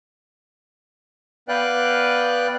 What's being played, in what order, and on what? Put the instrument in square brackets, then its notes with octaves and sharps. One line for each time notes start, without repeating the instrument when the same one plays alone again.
[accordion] B3 B4 D5 F5 G5 F#6